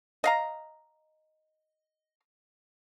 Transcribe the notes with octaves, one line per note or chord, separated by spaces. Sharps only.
D#5 F5 A#5